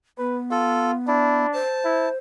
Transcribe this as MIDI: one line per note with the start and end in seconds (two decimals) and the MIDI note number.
0.18 1.45 59
0.18 0.38 71
0.51 0.94 65
0.51 0.91 69
1.08 1.61 62
1.08 1.47 64
1.53 2.16 72
1.53 2.09 81
1.85 2.09 64